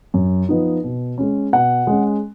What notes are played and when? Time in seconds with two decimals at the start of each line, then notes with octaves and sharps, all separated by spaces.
0.14 F#2
0.49 F3 B3 D#4
0.84 B2
1.18 G#3 C#4
1.53 B2 F#5
1.87 G#3 C#4